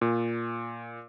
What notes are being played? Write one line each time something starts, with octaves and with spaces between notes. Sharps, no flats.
A#2